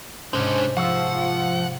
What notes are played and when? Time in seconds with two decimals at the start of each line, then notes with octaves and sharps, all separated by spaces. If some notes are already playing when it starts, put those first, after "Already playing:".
0.33 G#2 C3 G#3 C#4 D4 C5
0.77 F3 G#4 F5 F#5 C#6 E6